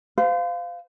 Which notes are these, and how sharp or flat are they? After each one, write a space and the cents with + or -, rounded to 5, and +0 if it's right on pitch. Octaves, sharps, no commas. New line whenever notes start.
C5 -40 F5 +0